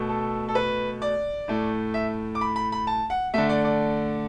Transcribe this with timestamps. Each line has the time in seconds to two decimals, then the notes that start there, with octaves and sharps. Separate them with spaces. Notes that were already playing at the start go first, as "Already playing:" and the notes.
Already playing: B2 A3
0.09 A4
0.49 A4
0.55 B4
1.02 D5
1.48 A2 A3
1.94 E5
2.35 D6
2.41 B5
2.56 B5
2.72 B5
2.87 A5
3.10 F#5
3.34 D3 A3 E5
3.49 D5
3.65 D5